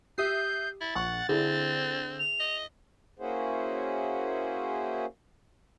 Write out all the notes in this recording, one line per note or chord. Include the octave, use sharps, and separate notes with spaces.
G4 E5 D#6 G6 C7
E4 A6
A#1 F#5 C#6 F#6
D3 C4 E4 G#4
F7
D#5
A#3 C#4 E4 F#4 G#4 C5